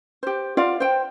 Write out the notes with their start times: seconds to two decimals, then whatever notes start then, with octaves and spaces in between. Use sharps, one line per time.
0.23 G4 C5
0.57 F4 D5 F5 F#5
0.80 C5 G5